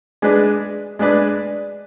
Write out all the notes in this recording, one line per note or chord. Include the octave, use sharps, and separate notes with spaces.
G#3 D4 G#4 B4 D5
G#3 D4 G#4 B4 D5